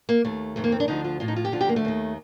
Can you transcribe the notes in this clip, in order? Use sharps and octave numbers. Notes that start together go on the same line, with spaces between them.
A#3
D#2 D#3 A3
F2 D#3 A3
A#3
C4
D4
D2 D3 F3 D#4
F4
A2 F3 F4
D#4
F4
G4
D2 D3 F3 F4
G4
A#3
A3
D#2 D#3